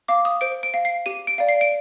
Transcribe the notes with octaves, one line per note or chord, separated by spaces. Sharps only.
F5 D6
D#6
C5 D7
D7
F5
C7
G4 D#7
D7
D5 F5
C7
D7